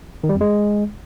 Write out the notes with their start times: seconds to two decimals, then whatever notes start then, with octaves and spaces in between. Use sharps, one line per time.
0.24 D#3
0.29 G3
0.35 F2
0.41 G#3